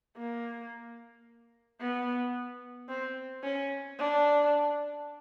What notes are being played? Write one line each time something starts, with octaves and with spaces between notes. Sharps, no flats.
A#3
B3
C4
C#4
D4